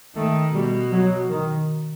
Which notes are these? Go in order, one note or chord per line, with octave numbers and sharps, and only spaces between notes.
D#3 A3
B2 G3
F#3
D#3